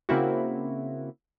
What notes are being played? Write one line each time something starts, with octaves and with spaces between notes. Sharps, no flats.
C#3 A#3 C4 E4 F#4